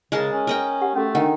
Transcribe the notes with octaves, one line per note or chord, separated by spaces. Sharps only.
C#3 G#3 A#4 A5
C#4
A#4 D#5 G5
G4 F#5
A3 C#4 F#4 A4
D#3 D4 F#5